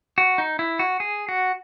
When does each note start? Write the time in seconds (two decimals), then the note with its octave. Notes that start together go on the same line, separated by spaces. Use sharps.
0.18 F#4
0.38 D#4
0.59 E4
0.79 F#4
1.00 G#4
1.29 F#4